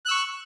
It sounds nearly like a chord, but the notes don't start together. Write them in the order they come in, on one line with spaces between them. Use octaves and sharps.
F#6 E6 C#6